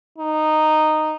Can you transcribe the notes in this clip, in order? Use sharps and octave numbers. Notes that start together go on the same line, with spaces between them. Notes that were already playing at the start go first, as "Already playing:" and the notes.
D#4